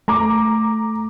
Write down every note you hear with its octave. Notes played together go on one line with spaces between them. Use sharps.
A3 A#5 D6